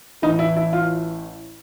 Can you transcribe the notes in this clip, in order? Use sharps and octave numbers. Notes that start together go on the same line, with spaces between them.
A1 A2 E3 D#4
E4
E4
F4